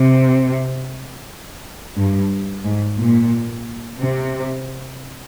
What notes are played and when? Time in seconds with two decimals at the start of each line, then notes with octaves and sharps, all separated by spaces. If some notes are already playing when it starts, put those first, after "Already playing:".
Already playing: C3
1.96 G2
2.64 G#2
2.98 A#2
4.00 C3